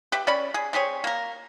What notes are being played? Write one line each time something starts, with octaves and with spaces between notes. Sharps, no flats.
G4 B4 E5
C#4 D5 B5
G#4
C4 G4 G#4 C#5
A#3 A#4